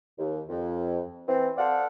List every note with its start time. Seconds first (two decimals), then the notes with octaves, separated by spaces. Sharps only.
0.19 D#2
0.49 F2
1.27 E3 C4
1.57 A4 C5 D5 F5 F#5